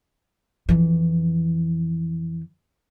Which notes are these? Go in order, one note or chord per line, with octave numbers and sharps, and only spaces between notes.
F2 E3